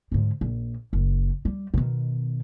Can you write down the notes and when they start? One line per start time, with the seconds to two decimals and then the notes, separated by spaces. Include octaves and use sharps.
0.12 G#2 D3
0.41 A#1
0.93 F#1
1.45 G3
1.74 B2 D#3